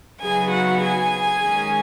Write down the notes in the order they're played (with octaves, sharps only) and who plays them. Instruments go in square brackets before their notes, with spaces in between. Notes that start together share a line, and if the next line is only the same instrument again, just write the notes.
[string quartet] C#3 F#3 B3 D#4 G#4 G#5
F#4 F#5
G#4 G#5
D#3 G#3 C#4